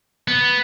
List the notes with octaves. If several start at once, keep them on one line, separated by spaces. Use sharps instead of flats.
B3